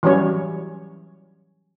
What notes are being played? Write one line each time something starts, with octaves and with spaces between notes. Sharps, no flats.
E3 F#3 G3 C#4 C#5